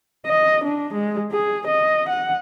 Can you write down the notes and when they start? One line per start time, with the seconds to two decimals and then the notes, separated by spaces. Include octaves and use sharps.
0.26 D#5
0.65 D4
0.94 G#3
1.32 G#4
1.67 D#5
2.09 F#5